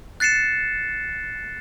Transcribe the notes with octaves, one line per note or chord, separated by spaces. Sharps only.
F#6 A6 C7 C#7 E7